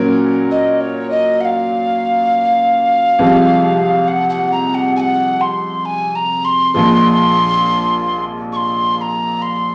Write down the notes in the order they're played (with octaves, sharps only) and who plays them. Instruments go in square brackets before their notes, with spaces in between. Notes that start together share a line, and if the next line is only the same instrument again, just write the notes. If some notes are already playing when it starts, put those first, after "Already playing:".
Already playing: [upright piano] A#2 F#3 C#4 F#4 A#4
[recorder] D#5
C#5
D#5
F#5
F5
[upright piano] C2 C3 F3 G#3
[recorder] F#5
F#5
A#5
F#5
G#5
F#5
C6
G#5
A#5
C6
[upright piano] A#1 A#2 F3 G#3
[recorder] C#6
C6
C6
A#5
C6